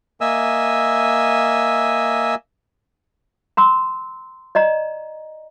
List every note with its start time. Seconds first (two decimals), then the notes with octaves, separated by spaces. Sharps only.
0.21 A#3 D#5 E5 G#5 E6
3.57 A#5 C6 E6
4.55 D5 D#5 A#5